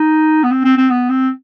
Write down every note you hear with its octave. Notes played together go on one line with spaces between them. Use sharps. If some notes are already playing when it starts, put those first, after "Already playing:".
Already playing: D#4
B3
C4
C4
C4
B3
C4